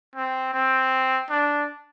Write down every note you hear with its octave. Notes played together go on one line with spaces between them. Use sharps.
C4
C4
D4